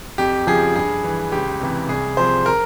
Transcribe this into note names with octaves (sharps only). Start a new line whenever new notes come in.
F2 G4
C#3 F3 G#4
G2 G#4
E3
C#2 G4
C3 E3
C2 G#4
C3 F3 C5
A#4